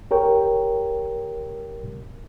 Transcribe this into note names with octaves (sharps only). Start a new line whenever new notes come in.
G4 A#4 C#5 G5